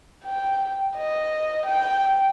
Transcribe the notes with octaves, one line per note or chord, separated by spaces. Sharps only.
G5
D#5
G5